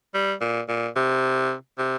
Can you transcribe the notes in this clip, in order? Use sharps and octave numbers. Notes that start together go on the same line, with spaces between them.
G3
A#2
A#2
C3
C3